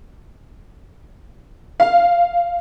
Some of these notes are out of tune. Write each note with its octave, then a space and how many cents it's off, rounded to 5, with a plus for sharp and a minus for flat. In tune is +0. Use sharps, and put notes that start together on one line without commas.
F5 -10